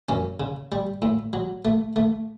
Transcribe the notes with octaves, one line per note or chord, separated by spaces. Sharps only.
F#2 C#4
C#3
G3
A2
F#3
A3
A3